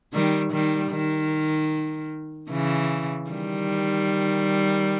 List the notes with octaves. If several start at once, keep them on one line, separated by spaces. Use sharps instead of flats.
D#3 G3
D#3 G3
D#3
C#3 E3
D#3 G3